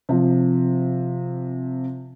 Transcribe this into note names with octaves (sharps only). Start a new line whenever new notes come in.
C3 F3